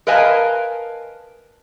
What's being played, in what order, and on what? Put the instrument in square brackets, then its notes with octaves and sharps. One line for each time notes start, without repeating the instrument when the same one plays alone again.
[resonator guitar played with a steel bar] A#4 B4 D#5 F5 G#5 A5